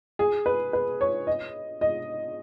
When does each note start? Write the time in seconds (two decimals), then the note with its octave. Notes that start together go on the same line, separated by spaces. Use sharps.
0.19 G#4
0.46 B4
0.73 B4
1.01 C#5
1.27 D#5
1.81 D#5